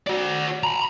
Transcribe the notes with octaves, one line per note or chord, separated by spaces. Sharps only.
F#4 D5
A#5 B5